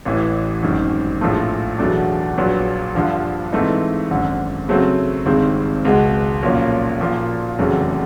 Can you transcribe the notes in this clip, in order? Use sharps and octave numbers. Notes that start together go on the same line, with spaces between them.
A1 A2 E3
G#1 F#2 D#3
A#1 A2 F3 A3
E2 B2 F#3 A3 D4
A#1 A#2 F#3 B3
G2 D3 F3
G#2 E3 A3 C4 D#4
G#1 F#2 D3
C#3 F#3 A3 C4
G#1 G2 D#3 G#3 C4
C#2 B2 G#3
B1 A#2 F3 A#3 C#4
A#2 F3 A#3
F1 E2 C#3 F#3 A3